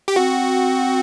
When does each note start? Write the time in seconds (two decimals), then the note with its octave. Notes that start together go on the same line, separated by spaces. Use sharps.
0.08 G4
0.16 C4 F#4